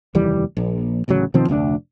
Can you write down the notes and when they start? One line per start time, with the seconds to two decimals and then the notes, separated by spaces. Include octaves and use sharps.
0.15 F1 D#2 E3 G3
0.57 A#1
1.08 D1 A1 C#3 F#3
1.34 B2 D#3 F3 C4
1.48 F1 D2 C#4 D4